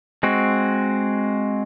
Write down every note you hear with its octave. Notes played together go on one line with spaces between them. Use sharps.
G#3 C4 F#4